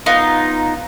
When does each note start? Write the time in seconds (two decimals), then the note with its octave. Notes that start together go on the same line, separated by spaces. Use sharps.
0.06 B3 D#4 F4